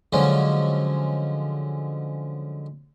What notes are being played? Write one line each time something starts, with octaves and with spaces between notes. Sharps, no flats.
D3 F3 F#3 G#3 C#4